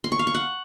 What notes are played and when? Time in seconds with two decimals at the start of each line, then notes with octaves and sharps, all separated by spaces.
0.04 C6
0.12 C#6
0.19 F5
0.27 C#6
0.35 F#5